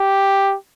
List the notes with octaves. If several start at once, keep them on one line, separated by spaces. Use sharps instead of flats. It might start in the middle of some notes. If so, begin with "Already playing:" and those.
Already playing: G4